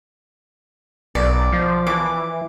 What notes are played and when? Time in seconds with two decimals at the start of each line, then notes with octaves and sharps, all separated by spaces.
1.15 B1 D5
1.52 F3
1.87 E3 D6